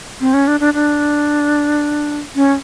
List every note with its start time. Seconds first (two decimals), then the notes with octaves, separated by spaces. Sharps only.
0.21 C4
0.34 C#4
0.47 D4
0.60 D4
0.74 D4
2.36 C#4